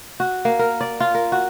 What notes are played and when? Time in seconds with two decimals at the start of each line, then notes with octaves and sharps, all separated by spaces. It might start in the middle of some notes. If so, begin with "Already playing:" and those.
0.20 F#4
0.45 A#3
0.59 A#4
0.81 D5
1.00 F4
1.15 A#4
1.32 F#4